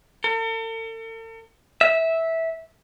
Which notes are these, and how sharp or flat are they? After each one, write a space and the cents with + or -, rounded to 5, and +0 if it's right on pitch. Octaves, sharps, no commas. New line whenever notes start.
A4 +45
E5 -15